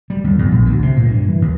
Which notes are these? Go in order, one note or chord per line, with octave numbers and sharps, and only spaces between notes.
G3
D#2
E2
A#1
D2
C3
A#2
G2
E3
D#2